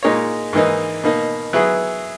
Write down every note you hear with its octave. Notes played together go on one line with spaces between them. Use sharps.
A#2 G#3 D#4 A#4 C#5
G#2 E3 A#3 D#4
B2 A#3 D#4
F#3 B3 E4 G#4